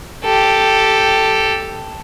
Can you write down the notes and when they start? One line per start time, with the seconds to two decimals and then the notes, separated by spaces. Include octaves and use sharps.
0.24 G4 A4